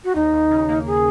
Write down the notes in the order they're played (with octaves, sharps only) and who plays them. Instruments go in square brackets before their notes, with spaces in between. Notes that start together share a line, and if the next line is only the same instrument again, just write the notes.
[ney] F#4
[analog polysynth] D#2 [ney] D#4
[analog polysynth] D#2
C#3
A#3
[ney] G#4